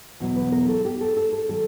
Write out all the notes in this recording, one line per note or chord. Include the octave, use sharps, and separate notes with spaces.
E2 B2 F#3
B4
A#4
A4
G4
A4
A4
A4
D#3 F#3 A4